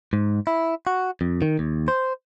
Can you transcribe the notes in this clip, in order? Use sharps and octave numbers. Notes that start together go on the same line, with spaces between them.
G#2
E4
F#4
F2
D#3
D#2
C5